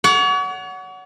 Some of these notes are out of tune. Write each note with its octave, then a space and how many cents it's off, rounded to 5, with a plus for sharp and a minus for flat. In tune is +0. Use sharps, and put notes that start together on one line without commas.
C#5 +40 F#5 +0